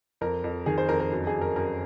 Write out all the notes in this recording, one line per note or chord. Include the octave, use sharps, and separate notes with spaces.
F2 A#4
F2
D#3 G#4
C5
F2 A#4
A#4
F#2
G#4
F#2
A#4
F#2 A#4